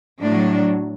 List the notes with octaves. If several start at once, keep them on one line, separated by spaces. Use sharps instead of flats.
A2 F#3 D4